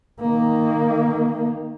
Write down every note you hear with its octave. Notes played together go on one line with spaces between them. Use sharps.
D#3 A#3